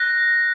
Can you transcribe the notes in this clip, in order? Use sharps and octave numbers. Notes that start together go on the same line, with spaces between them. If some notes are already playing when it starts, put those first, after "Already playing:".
Already playing: F#6 A#6